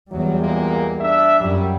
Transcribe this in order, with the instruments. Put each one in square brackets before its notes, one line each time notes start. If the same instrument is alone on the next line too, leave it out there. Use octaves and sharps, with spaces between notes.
[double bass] E2 G3 [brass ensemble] F#3
[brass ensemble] A#2 G#3 A#3
D4 D5 E5
[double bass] F#2 [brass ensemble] A#2 F#3 G3